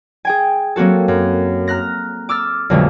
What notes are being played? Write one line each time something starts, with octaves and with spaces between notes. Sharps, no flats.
G#4 G5 G#5
F#3 A#3 C4 F#4 A4
F#2
A#5 F6 F#6 A#6
D6 E6 F6 A6
B1 F2 D3 G#3 A3